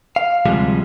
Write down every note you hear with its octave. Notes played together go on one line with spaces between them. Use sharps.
F5
D2 C3 F3 G3 G#3